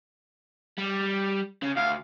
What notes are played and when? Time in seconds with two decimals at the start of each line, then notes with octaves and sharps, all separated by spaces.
0.78 G3
1.63 C#3
1.76 D2 F5